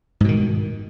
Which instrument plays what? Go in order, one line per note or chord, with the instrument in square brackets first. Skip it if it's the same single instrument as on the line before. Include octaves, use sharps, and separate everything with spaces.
[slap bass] G#2
B2
D#3